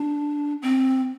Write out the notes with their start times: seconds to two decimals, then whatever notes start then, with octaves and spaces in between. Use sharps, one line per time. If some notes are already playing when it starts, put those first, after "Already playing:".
Already playing: D4
0.62 C4